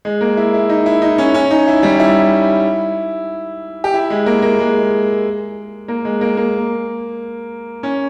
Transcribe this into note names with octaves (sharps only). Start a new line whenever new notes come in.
G#3
A#3
E4
E4
D#4
E4
D#4
C#4
C#4
D#4
E4
G3
E4
G4
E4
G#3
A#3
A#3
G#3
A#3
G#3
A#3
A#3
C#4